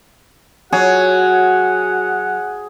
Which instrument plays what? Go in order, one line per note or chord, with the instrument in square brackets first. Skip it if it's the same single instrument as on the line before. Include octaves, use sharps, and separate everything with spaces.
[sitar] F#3 [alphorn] F#4 [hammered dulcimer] G#4 [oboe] F#5